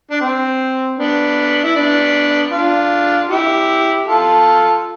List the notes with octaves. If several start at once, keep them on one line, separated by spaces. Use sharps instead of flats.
D4
C4
B3 D4
E4
B3 D4
D4 F4
E4 G4
F4 A4